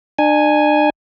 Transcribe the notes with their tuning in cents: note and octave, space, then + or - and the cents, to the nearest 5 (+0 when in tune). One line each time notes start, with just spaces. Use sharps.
D4 +40 G#5 +0